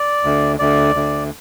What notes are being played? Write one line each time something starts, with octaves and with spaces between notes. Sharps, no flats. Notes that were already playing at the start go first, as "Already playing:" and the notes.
Already playing: D5
D2
D2 D5
D2